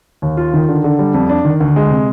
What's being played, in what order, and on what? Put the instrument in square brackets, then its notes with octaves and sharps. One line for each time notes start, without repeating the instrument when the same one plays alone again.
[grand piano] D#2
F4
D#3
D3
D3
G3
F2
D4
D#3
D2
G#3
C3